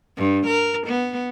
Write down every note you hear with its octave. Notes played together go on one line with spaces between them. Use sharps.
G2
A#4
B3